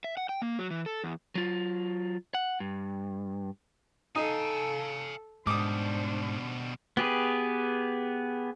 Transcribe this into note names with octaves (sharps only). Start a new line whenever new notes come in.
E5
F#5
G5
A#3
F#3
E3
A4
E2
F#3 F4
F#5
G2
D#4 A4 F5 G#5
G#2 B2 G3 D4 C5 D6 D#6
B3 G4 G#4 B4